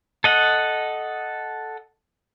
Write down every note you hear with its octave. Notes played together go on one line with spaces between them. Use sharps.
A4 D#5 F#5